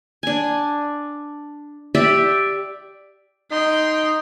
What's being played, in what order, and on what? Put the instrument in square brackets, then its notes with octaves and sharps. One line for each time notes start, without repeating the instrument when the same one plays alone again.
[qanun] D4 G#5
G4 D5 E5 G5
[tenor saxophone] D#4 [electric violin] G5 C6